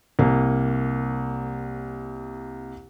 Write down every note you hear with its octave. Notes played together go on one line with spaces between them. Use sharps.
C2 A#3